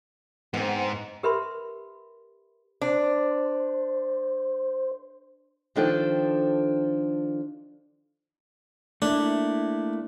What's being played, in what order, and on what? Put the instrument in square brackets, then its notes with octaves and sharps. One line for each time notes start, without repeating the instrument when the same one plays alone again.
[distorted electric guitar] G#2 [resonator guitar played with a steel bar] B3 C4
[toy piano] G4 A#4 B4 E5 B5 C6
[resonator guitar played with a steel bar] D4 [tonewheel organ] C5
[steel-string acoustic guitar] D#3 F3 D4 A4 C5 G5
[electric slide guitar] A3 A#3 E4 [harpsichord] D4